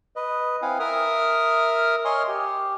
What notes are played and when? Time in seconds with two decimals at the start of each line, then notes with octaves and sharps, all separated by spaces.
0.16 B4 D#5
0.62 C4 E4 F5 F#5 G#5
0.80 A#4 E5 D#6 F6
2.05 C#5 D#5 G#5 C6 C#6 F6
2.28 G4